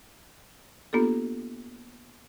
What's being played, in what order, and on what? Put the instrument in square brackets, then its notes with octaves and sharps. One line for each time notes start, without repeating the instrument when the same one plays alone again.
[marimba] A#3 B3 D4 F4 G4 A4